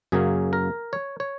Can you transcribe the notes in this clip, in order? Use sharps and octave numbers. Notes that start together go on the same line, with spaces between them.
F#2 C#3 F#3 A#3 C#4 G#4
A#4
C#5
C#5